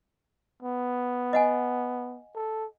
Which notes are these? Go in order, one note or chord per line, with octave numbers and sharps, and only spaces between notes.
B3
D#5 F#5 G#5
A4